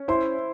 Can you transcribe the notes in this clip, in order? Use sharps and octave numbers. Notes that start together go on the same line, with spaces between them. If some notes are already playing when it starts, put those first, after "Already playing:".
Already playing: C#4
E4 C5 C6